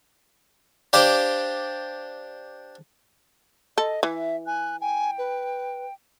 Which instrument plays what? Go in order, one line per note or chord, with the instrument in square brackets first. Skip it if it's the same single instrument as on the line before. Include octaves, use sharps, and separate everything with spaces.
[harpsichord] D4 G4 C5 D5 F5 C6
[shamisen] A4 [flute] D#5
[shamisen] E3 [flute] E5
[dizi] G#5 [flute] F#6
[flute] G5 [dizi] G#5
[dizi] B4